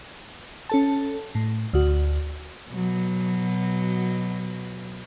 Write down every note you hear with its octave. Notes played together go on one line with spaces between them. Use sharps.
C#4 A4 A5
A2
D2 F#4
B2 F#3